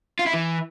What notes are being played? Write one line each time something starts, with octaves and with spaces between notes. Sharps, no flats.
F4
E4
E3